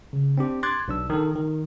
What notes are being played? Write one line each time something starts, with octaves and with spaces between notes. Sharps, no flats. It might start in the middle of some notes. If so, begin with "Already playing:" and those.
C#3
C4 D4 G4
C6 D6 F#6 G#6 A6
B1 D4 E6
D#3 A4
D#3